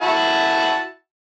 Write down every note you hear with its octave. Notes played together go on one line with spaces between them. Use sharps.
E4 F#4 A5